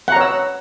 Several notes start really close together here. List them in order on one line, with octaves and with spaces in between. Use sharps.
F#5 A#5 C#5 E6